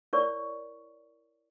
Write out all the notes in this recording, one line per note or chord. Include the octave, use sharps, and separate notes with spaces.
E4 A#4 C#5 D5 C#6